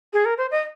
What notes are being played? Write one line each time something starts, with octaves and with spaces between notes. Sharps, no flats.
G#4
A#4
C5
D#5